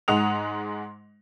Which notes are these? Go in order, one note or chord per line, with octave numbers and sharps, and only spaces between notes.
G#2 G#3 F#5 D#6 F7